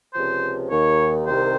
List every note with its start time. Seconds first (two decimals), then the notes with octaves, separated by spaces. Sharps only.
0.14 C#2 C3 F3 C5
0.70 D#2 D#3 C#5
1.26 C2 C3 D#3 C5